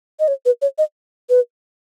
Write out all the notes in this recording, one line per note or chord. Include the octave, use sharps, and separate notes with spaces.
D#5
C#5
B4
C#5
D#5
B4